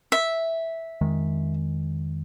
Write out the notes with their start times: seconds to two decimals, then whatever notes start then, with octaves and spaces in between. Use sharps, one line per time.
0.12 E5
1.01 F2 D#3 G#3